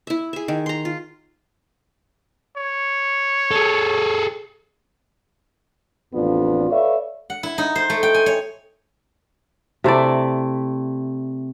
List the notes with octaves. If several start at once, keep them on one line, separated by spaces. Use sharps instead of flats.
E4 E5
G#4 E5
D#3
A#5 C6
F4
C#5
G#4 A4
A1 F2 B3 D4 F4
A4 B4 C#5 D5 E5 F5
F#5
E4
D#4
C5
A3
G5
G#5
C#5
C3 A3 E4 D5